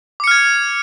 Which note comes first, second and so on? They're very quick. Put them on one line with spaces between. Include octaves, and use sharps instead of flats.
D6 C#7 F6 G#6